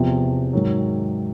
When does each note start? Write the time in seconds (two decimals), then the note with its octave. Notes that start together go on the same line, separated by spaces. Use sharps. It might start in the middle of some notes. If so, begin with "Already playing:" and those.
Already playing: E2 C3 F3
0.53 G#2 D#3 F#3